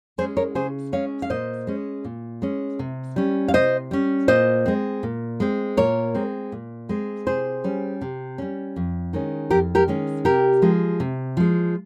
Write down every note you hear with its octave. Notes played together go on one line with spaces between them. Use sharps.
G#3 C#4 G#4 C5
A#4 C#5
C#3 G#4 C5
G#3 C#4 C#5 F5
F5
A#2 C5 D#5
G#3 C#4
A#2
G#3 C#4
C3
G3 C#4
F5
C3 C5 D#5
G3 C#4
A#2 C5 D#5
G#3 C4
A#2
G#3 C4
A#2 A#4 C#5
G#3 C4
A#2
G#3 C4
C3 G#4 C5
G3 C#4
C3
G3 C#4
F2
D#3 G#3 C#4
F2 G4 A#4
G4 A#4
D#3 G#3 C#4
C3 G4 A#4
F3 G#3
C3
F3 G#3